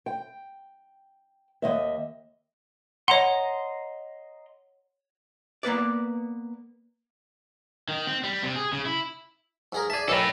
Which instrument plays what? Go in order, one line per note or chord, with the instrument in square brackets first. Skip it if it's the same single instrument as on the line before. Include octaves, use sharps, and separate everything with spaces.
[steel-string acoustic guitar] G5
D#2 E3 D#5 E5
[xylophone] C#5 F#5 [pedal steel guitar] D#5 A#5 C6
[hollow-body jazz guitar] A#3 B3 B4 D5
[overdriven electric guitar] D#3
C4
G3
C3
G#4
C#3
E4
[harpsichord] G#2 G#4 A#4
[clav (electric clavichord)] G#4 E5 [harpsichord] D5 A5
[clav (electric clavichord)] B1 [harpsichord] D#3 C#4 [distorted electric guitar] A4 B5